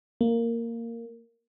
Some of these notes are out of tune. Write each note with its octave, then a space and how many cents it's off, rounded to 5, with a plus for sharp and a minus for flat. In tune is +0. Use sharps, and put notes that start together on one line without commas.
A#3 -10